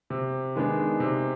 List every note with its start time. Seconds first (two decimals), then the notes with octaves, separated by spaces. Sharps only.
0.10 C3
0.56 D#3 G#3 B3 D4
1.00 C3